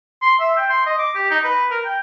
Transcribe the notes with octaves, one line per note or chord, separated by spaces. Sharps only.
C6
E5
G5
C6
D#5
D6
G4
D#4
B4
A#4
G5